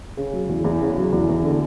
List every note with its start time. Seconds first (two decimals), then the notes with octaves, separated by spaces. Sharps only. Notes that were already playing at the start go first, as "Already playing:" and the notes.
0.17 C#3
0.33 F#3
0.49 E2
0.64 E2
0.81 C#3
0.97 F#3
1.12 E2
1.29 E2
1.44 D3